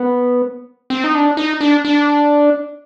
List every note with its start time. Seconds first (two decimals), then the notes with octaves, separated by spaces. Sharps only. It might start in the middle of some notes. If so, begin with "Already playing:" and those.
Already playing: B3
0.90 C4
1.04 D#4
1.15 D4
1.37 D#4
1.61 D4
1.85 D4